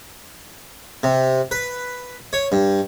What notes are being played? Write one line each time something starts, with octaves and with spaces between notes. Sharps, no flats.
C3
B4
C#5
G2